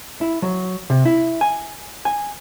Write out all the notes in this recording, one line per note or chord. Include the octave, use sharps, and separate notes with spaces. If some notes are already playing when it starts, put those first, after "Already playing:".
E4
F#3
C3
E4
G#5
G#5